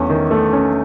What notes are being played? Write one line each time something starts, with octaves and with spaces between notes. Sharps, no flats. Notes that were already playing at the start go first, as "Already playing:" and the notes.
Already playing: E2 A3 C#4
D#3
A3
C#4